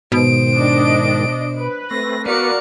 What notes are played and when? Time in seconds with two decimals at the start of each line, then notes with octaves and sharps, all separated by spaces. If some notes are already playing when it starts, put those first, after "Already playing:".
0.12 G#2 B2 D#3 C5 D7
0.55 D4 D#5
1.56 B4
1.91 A3 C4 A#6
2.26 B3 F#4 A#4 B4 D5 F5 C#7